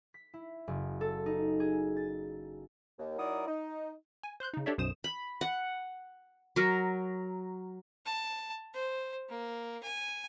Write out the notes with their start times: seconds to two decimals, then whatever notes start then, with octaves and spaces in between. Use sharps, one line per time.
0.14 B6
0.34 E4
0.68 F#1
1.01 A4
1.26 D#4
1.60 G#4
1.97 A6
2.99 D#2
3.19 F#3 D#4 E4 A#4 D5 D#6
3.48 D#4
4.23 G#5
4.40 C5 C6 F#6 G6
4.54 C#3 D#4
4.66 D4 G4 A4 C#5 D5 E5
4.78 B1 F#2 B2 C5 D#6 E7
5.04 B5
5.41 F#5
6.56 F#3 A#4
8.06 A5
8.74 C5
9.29 A#3
9.83 G#5